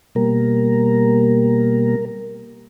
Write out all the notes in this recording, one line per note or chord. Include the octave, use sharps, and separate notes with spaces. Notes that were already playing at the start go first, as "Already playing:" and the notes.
B2 G3 A#3 A#4